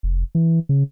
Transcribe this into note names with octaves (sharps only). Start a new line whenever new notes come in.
F1
E3
C#3